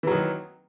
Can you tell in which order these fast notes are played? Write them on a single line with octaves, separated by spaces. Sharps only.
E3 F#3 D#3